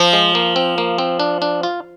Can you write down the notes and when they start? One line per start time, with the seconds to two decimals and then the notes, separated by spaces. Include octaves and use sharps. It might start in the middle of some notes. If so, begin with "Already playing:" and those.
Already playing: F3
0.13 G#3
0.35 A#3
0.56 C4
0.78 A#3
0.98 C4
1.20 D4
1.42 D4
1.63 F4